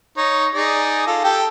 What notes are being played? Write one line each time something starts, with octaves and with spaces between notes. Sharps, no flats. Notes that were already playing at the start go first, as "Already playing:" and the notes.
D#4 C#5
D#4 G#4 D5
F4 A4
G4 A4 G5